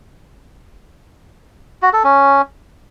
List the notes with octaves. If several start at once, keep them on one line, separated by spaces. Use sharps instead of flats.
F#4
A4
C#4